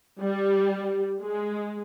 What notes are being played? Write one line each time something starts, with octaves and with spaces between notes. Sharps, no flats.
G3
G#3